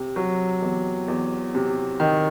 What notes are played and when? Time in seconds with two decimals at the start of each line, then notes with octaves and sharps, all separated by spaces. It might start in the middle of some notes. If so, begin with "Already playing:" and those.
Already playing: C3
0.16 F#3
0.62 E2
1.08 E2
1.55 C3
2.00 D#3